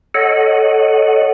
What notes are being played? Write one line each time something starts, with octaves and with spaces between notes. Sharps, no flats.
A4 C#5 D#5 F#5